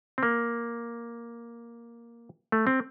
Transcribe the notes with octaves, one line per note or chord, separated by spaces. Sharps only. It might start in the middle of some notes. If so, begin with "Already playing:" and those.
C4
A#3
A3
C4